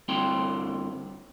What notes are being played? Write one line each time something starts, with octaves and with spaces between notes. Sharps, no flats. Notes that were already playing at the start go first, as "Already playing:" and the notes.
G2 D3 C4 E4 G5 C6